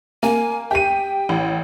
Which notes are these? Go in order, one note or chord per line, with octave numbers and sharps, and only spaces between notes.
A#3 G#5
G4 G5 D#7
A1